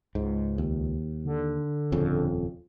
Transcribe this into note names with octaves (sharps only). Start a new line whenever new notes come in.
C#2 G#2
D#2
D3
D#1 F2 C#3